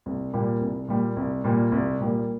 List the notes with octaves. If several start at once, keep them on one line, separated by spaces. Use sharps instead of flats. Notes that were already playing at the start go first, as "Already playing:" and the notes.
C2
A#2 G3 A#3
C2
A#2 G3 A#3
C2
A#2 G3 A#3
C2
A#2 G3 A#3